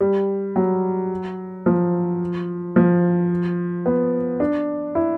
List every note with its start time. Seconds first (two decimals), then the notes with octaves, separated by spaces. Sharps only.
0.01 G3
0.56 F#3
1.66 F3
2.76 F3
3.86 B3
4.40 D4
4.95 E4